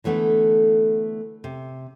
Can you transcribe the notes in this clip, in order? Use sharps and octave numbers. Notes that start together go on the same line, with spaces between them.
D3 E3 A3 B3 D4
C3